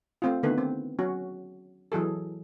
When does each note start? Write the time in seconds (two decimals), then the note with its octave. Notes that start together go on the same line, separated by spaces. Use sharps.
0.22 A3 C4 F4
0.43 D3 D#3 A3 B3 B4
0.58 C4
0.99 F#3 C#4 F#4
1.92 E3 F#3 G#4 A4